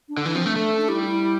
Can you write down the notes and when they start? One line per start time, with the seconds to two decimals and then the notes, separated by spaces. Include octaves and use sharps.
0.09 D4
0.17 D3
0.25 E3 D4
0.35 F3 C4
0.46 A3 D4
0.56 A3
0.81 D4
0.88 G3 E4
1.04 E4